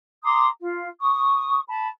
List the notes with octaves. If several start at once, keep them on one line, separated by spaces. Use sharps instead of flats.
A#5 C6 D6 D#6
F4
C#6 D#6
A5 B5